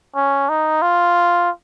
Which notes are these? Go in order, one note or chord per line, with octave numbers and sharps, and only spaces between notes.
C#4
D#4
F4